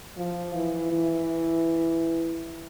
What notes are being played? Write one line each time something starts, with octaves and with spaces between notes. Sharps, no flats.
F3
E3
E3